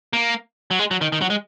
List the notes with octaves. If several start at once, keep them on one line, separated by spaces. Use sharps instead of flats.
A#3
F#3
G#3
F#3
D#3
D#3
F#3
G#3